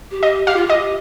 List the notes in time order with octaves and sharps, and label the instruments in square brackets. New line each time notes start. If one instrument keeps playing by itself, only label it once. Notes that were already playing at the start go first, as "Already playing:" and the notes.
[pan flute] G4
[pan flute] G4 [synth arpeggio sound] D#5
[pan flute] G4 [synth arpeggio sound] F5
[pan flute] F4
[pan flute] G4 [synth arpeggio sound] D#5